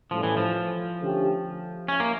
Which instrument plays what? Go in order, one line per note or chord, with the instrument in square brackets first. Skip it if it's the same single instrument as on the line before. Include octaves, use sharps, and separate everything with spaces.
[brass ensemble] A2 G3 C#4 E4 A4 [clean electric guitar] F3
[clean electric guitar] E3
F3
[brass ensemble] D3 A3 C#4 G4
[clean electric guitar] C#4 [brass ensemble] E4
[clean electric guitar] A#3